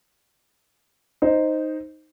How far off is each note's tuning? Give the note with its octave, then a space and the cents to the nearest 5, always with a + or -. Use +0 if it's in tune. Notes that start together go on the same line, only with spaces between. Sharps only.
D#4 +0 C5 +0